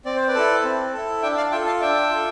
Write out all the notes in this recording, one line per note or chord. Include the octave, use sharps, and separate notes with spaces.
C4 D5
C5
B4 D5
E4 A4
C4
E4 A4
D4 E5 G5
D5 F5
F4 A4 E5 G5
F5 A5
D4 E5 G5
F4 A4